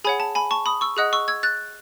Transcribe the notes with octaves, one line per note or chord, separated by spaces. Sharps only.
G#4 C#5 F#5 G#5 B5
A5
G#5 B5
A5 C#6
B5 D#6
C#6 E6
G#4 D#5 F#5 D#6 F#6
C#6 E6
E6 G#6
F#6 A6